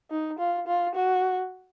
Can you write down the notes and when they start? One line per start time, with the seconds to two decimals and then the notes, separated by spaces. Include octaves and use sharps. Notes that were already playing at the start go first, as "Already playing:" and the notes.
0.11 D#4
0.39 F4
0.67 F4
0.95 F#4